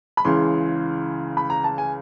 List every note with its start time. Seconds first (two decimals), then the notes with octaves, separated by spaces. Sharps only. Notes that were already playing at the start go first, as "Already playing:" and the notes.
0.17 B5
0.25 C#2 C#3 E3 C6
1.37 B5
1.50 A#5
1.64 A5
1.78 G#5